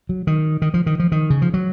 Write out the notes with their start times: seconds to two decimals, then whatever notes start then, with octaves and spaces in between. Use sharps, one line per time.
0.09 F#3
0.27 D#3
0.62 D#3
0.74 F3
0.86 D#3
1.00 F3
1.12 D#3
1.30 C#3
1.42 F3
1.54 F#3